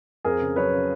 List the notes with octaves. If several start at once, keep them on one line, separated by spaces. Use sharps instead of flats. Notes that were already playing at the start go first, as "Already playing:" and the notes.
F2 G#4 A#4
C#3
F#3 B4 C#5
C#3